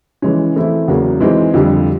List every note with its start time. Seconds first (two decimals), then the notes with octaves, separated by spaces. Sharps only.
0.22 E3 G#3 C#4
0.56 E3 A3 C4 E4
0.88 E2 C#3 F#3 A#3
1.20 E3 G#3 C4 D#4
1.54 F2 D3 G3